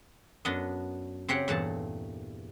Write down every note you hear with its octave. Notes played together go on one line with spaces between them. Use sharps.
F#2 B3 D4 D#5
C#3 C4 G4 C5 C#5 F#5
E2 G2 A#2 A3 F#5 A5